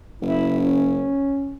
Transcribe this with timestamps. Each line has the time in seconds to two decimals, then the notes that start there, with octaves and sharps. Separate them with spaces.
0.22 F#1 E4
0.61 C#4